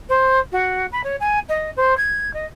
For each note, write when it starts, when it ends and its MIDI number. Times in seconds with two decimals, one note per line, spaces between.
0.09 0.40 72
0.52 0.86 66
0.92 1.01 83
1.04 1.16 73
1.20 1.39 80
1.49 1.71 75
1.76 1.96 72
1.97 2.31 92
2.34 2.46 75